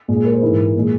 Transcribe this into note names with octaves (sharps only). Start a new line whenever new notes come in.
A#2 G#3
G#4
A#4
C5
G#2 E3 G#3 A#4
A#2 G#3